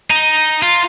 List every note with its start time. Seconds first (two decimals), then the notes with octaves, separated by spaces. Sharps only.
0.10 D#4
0.63 F4